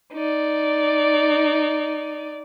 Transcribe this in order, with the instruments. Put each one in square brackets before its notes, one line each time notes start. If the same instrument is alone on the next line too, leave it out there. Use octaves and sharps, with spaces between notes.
[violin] D#4 D5